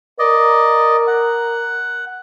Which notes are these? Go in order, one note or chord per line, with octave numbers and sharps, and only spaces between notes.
A#4 D5 D#5
F#5